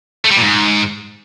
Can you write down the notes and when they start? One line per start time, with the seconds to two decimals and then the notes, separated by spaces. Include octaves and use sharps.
0.24 A3
0.31 G3
0.37 A#2
0.43 G#2